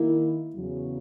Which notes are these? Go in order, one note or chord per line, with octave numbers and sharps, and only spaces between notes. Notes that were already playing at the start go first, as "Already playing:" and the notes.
Already playing: D#3 A#3 E4
E2 C#3 F#3